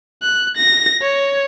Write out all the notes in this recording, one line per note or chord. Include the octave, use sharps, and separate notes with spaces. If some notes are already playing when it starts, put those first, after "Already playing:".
F#6
A#6
C#5